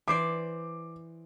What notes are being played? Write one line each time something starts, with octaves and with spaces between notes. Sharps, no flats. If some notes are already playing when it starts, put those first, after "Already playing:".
E3 C5 D5 D6